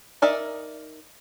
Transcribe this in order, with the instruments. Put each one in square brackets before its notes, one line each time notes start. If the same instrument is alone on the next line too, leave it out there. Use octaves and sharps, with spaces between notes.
[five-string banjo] D#4 A#4 D5 E5